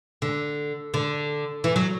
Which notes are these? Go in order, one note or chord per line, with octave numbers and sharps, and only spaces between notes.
D3
D3
E3
F#3